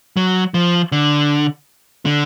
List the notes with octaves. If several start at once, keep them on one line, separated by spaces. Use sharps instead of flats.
F#3
F3
D3
D3